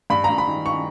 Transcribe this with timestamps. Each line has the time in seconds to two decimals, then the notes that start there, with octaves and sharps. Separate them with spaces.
0.10 G2 B5
0.24 G2 A#5
0.38 B5
0.48 D#3
0.66 D#3 C#6